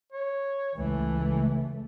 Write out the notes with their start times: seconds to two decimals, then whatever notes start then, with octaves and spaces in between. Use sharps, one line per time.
0.12 C#5
0.75 C#2 E3 A3